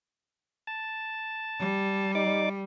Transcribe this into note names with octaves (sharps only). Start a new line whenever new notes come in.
A5
G3
D#4 D5 D6